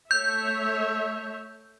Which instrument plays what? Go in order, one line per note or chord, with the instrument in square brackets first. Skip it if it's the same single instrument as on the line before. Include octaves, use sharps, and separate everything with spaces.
[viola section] A3 C#5 E5 [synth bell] G6